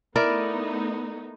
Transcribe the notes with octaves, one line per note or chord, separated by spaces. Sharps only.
A3 B3 D#4 E4 A#4 D5